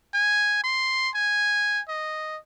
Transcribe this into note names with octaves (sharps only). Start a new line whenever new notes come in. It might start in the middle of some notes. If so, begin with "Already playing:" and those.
G#5
C6
G#5
D#5